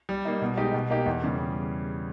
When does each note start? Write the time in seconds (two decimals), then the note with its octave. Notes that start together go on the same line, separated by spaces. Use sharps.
0.09 G3
0.25 A#3 D#4
0.42 B2
0.57 G#3 D#4 G4
0.74 B2
0.90 A#3 D#4 G4
1.06 E2
1.23 C#3 G3